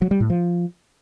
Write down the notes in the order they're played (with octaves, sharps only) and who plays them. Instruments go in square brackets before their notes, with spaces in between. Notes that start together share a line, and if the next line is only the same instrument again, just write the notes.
[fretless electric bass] F#3
G3
A2
F3